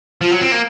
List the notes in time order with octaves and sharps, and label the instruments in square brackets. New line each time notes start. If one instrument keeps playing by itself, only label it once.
[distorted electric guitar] F3 [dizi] F4
[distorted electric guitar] F#3
C4
A#3